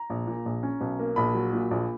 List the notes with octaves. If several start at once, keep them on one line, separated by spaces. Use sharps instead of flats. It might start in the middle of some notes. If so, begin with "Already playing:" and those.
Already playing: A#5
A#1
A#2
A#1
C#4
B1
A#3
A#1 B5
F#3
A#2
A#1